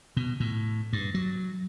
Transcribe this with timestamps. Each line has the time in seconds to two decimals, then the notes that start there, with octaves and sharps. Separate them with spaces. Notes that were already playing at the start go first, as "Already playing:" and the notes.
0.17 B2
0.40 A2
0.93 G2
1.14 F#3